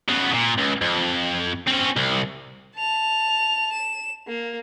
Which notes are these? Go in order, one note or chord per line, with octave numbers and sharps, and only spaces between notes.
C#3 B3
A#2 C#3
C#2
F2
C4 C#4
C2
A5 F7
E7
A#3